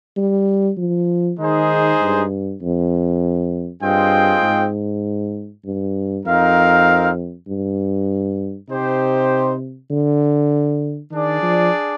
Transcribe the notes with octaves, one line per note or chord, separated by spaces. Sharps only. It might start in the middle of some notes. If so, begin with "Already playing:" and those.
G3
F3
D#3 G#3 D#4 G#4 C5
G2
F2
G2 C4 F4 G#4 D#5 G5
G#2
G2
F2 C4 D#4 A#4 F5
G2
C3 D#4 G4 C5
D3
D#3 D4 G#4 D5
F3